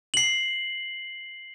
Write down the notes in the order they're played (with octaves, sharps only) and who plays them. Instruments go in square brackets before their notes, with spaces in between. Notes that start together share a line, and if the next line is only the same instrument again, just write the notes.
[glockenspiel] C7 F#7